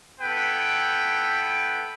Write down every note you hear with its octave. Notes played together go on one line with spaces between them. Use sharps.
B3 E4 A4 B4 G5